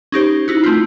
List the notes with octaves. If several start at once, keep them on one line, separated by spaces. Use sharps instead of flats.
C#4 D#4 G4 C5
D#4 E4 F#4
A3 C4 E4 F4